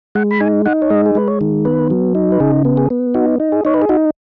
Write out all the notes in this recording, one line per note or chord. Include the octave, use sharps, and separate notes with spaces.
G#3 F#5
B5
D#4 G#5
D#4 F#5
C#5
G#3 D#5
G#4
G#3 B4
C#5
D#3
B3 B4
F#3
D#4
B4
C#3 G#4
B3
G#4
B3
D#4 F#4
D#4
G#4
D#4 C#5
B4
G#4
D#4 F#4